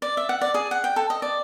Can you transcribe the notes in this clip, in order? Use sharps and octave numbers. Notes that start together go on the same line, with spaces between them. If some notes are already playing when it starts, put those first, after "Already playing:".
D5
E5
F#5
D5
G#4
F#5
G5
A4
D#5
D5